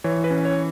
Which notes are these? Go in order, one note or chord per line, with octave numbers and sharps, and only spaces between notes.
E3 C#5
B4
C#4
C#5